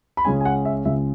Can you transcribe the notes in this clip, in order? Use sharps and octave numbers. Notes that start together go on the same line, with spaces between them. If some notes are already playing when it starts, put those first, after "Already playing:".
B5
C#2 C#3 G#3 C#4 G#5
G#5
F#5
E5
C#2 C#3 G#3 C#4 E5